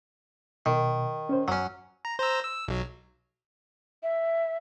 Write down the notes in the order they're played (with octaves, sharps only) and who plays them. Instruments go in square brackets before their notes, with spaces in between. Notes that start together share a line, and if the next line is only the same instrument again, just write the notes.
[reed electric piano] B2 [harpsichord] D#3
[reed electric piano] C#4 C5
[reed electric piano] F#2 [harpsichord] F#3 C#4
[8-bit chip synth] A#5
C5 A#5 E6
E6
B1 F#3
[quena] E5